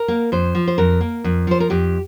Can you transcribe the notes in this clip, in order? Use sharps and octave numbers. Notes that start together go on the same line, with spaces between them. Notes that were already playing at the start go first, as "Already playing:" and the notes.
Already playing: A#4
A#3
F2 C5
F3
C5
F2 A#4
A#3
F2
F3 C5
A#4
F2 G4